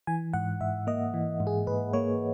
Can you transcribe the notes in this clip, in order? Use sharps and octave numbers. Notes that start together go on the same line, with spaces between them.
E3 G#5
G#2 F#5
G#2 E5
A#3 D#5
E3
G#2
G#4
G#2 B4
A#3 C#5